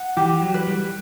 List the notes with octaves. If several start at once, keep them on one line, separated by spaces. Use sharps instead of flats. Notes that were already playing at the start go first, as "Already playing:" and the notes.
Already playing: F#5
E3 G4
F#3
B4
G3